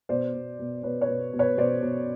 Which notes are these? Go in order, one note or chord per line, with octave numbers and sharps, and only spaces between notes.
B2 C5 D5
B2
B2
B2 B4 C#5
B4 C#5
B2
B2
B4 C#5
B2 C5 D5
B2